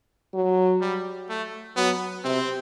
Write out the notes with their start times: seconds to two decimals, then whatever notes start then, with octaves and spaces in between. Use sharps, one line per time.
0.34 F#3
0.81 G3
1.29 A3
1.76 F#3 B3
2.24 C3 C4